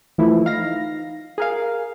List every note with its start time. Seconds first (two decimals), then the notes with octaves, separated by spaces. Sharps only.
0.18 E3 F3 A3 E4
0.45 D#4 F5 A#6
1.38 G#4 A#4 F5